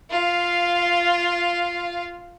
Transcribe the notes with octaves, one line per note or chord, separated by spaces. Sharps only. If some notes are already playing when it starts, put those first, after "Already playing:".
F4 F5